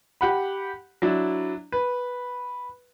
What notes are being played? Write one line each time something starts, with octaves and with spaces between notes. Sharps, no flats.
G4 F#5 B5
F#3 D4 E4
B4